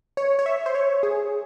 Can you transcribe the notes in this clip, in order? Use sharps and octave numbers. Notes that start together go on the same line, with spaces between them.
C#5
C#5
E5
C5
C#5
G#4